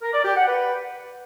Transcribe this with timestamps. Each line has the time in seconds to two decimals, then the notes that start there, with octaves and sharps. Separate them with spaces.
0.02 A#4
0.13 D5
0.25 G4
0.36 F#5
0.48 B4